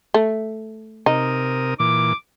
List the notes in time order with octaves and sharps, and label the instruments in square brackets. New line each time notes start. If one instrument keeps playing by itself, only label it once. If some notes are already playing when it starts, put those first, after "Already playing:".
[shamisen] A3
[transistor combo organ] C3 A#4 D#6 [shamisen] D#4
[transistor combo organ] A#2 E3 [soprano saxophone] D6